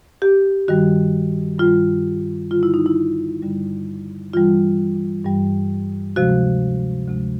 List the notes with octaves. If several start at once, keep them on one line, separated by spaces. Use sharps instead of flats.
G4
G2 D#3 G3 F#4
G2 D#3 G3 F4
G2 D3 G3 F4
E4
D#4
E4
G2 D3 G3
G2 E3 G3 F4
G2 E3 G3
D2 C3 F3 G#3 F#4
D2 C3 F3 G#3